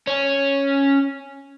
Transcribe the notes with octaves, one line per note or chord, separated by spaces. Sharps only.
C#4